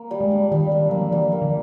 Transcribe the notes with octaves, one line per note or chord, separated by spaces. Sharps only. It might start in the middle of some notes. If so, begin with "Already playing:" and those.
Already playing: A#3
G3
G#3
D4
D#3 G3
D4
F#3 A#3
F3
E3 G3
A#3
D3